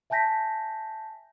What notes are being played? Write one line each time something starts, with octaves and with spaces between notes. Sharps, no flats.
E5 G#5 A5 G6 A#6 B6